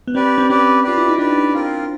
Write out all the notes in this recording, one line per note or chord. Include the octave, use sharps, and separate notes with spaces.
B3
C4 G4 B4 D5
C4
C#4 G4 B4 D5
F4 G4 B4 D5
E4
D#4
D4 G4 B4 D5
C4 F4 A#4